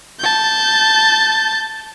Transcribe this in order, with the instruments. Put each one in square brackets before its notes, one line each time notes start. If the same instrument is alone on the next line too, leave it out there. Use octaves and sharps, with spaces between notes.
[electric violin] A5 G6